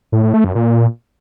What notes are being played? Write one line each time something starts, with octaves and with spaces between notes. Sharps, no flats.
A2
A2
A3
F#2
A#2